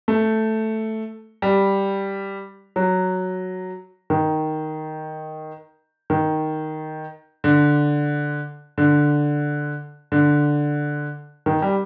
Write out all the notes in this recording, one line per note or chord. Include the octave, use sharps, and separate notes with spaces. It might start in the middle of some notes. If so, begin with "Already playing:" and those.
A3
G3
F#3
D#3
D#3
D3
D3
D3
D#3
G3